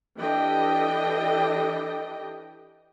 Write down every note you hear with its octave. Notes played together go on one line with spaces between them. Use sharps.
E3 D4 G4 A4 D#5 G5